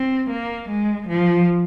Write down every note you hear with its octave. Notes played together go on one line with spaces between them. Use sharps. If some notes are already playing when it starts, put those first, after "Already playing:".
Already playing: C4
A#3
G#3
F3